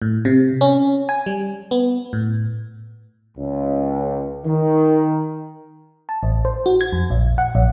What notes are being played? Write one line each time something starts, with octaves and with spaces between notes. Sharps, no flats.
A2
C3
C#4
G#5
G3
B3
A2
C#2
D#3
A5
A1
C5
F#4
G#6
F2
A#1
F#5
A#1